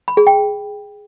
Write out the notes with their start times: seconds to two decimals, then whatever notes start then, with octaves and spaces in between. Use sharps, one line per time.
0.08 B5
0.17 G#4
0.27 G5